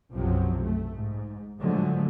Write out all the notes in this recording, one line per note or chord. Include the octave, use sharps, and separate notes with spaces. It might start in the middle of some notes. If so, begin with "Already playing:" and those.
B1 F#2 C3 F3 F#3
F#2 A3
G#2
A2 D3 F3 F#3 G#3 A3